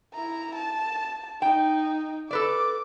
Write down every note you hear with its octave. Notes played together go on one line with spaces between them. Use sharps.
E4 A#5
A5
D#4 G5
A4 B4 D5 D6